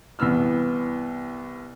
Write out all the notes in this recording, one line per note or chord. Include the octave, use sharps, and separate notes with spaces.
C2 E3 B3 E6 F6